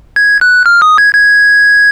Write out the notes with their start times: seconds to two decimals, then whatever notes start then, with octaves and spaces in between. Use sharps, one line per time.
0.16 G#6
0.41 F#6
0.66 F6
0.82 D#6
0.98 G#6
1.15 G#6